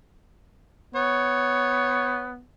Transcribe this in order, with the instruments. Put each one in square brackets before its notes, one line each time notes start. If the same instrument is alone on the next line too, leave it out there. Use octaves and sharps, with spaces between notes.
[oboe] B3 [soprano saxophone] C#5